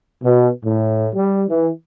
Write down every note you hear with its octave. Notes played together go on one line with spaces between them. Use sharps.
B2
A2
G3
E3